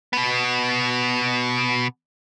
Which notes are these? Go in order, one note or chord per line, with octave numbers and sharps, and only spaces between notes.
B2 B3